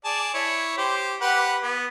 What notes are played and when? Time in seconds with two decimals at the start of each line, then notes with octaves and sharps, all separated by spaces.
0.05 G#4 D5 A5
0.34 E4 C#5
0.78 G4 C5
1.21 G4 B4 F#5
1.63 B3